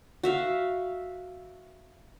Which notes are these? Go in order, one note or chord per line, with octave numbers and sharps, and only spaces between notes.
F#4 E5 F5